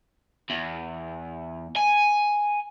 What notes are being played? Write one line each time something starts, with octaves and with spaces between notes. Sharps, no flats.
E2
G#5